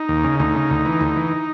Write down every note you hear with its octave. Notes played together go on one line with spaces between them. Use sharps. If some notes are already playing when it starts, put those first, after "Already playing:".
Already playing: D#4
D#2
C#3
D2 D#4
C#3
D2
E3
D2
E3